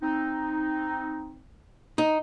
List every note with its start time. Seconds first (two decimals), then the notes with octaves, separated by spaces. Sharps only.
0.02 C4 D#4
1.98 D#4